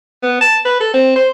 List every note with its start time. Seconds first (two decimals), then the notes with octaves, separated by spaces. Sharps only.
0.23 B3
0.41 A5
0.65 B4
0.80 A4
0.94 C4
1.16 C5